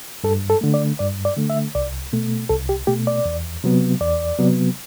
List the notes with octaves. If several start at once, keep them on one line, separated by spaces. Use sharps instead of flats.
G2 A4
A4
D3 A3
D5
G2 D5
D5
D3 A3
E5
C2 D5
B2 A3
C2 A4
G4
B2 A3 G4
D5
E2
C3 F#3 B3
E2 D5
C3 F#3 B3